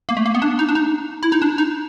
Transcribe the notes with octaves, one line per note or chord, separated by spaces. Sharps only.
A#3
A3
A#3
B3
D4
D#4
D4
D#4
E4
D#4
D4
D#4